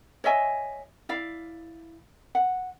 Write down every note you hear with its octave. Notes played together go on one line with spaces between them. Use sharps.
C#5 D#5 E5 G#5
E4 D5 F5
F#5